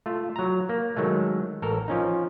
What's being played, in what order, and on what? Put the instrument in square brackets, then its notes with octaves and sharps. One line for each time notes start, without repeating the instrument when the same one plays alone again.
[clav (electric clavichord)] A3 F4
F#3 A#5
A#3
D#3 F#3 G#3 A3
A1 A4 A#4
F3 C#4 D#4